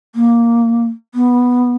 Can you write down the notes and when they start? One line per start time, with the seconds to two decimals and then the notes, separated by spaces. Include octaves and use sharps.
0.15 A#3
1.15 B3